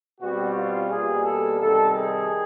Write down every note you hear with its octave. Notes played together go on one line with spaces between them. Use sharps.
B2 G3 C4 F#4
F4
B2 G3 A#3 G#4
A4
C3 D#3 G3 A4
G#4